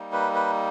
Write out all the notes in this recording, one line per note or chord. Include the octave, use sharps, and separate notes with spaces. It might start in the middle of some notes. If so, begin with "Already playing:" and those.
Already playing: G3 A#3 D#4
B4
B4